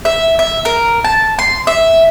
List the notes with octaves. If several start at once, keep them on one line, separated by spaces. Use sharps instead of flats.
E5
E5
A#4
A5
C6
E5